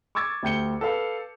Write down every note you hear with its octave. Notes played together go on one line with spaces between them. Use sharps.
C#6 D6 E6 G#6 A6
D2 G4 G6 C#7 G7
A4 B4 F5 E6